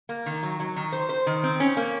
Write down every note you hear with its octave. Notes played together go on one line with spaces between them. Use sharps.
A#3
D#3
F#3
F#3
D#3
C5
C5
D#3
C4
C#4
A#3